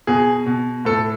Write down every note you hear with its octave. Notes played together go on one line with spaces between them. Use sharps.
B2 G#4
B2
A2 A4